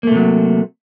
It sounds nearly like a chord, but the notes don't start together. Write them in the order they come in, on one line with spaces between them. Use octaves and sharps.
A#3 A3 C3 F#3